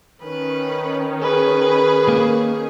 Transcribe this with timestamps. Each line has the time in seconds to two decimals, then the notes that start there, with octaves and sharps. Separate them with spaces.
0.23 D#3 C#4 B4
1.22 G#4 B4
2.09 A#3